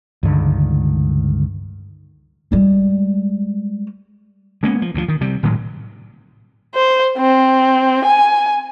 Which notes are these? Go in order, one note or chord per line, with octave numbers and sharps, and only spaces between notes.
C#2 G2 D3 D#3
G3 G#3
G#3 A#3 B3 C#4
F3
D2 G2 F3
D#3
C3 G3
G#1 A2 D#3 F#3
C5
C4
G#5